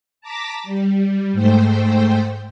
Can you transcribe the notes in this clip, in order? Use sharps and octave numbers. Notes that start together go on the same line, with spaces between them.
A5 A#5 D6 A6 B6
G3
G#2 A3 C5 G5